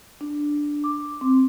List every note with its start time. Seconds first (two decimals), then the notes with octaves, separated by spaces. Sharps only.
0.21 D4
0.84 D6
1.21 C4